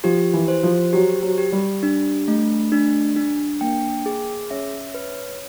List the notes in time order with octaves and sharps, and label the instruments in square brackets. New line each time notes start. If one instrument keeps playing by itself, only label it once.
[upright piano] F3 [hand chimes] G4
[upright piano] E3
[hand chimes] C5
[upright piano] F3
[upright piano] F#3 [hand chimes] G4
[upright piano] F#3
[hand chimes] G4
[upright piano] G3
[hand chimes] D4
A3
D4
D4
[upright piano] A#3 [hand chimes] G5
[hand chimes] G#4
[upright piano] C#4 [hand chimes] E5
[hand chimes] B4